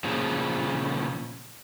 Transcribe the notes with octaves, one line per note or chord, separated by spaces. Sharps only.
A#2 C#3 F3